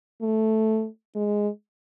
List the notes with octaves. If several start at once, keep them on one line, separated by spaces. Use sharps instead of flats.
A3
G#3